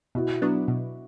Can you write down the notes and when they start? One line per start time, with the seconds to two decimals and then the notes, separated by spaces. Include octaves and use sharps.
0.15 B2 E4 F#4
0.42 F#3 B3 D4
0.68 B2